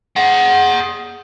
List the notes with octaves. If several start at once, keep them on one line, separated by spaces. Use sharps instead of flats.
G#4 F#5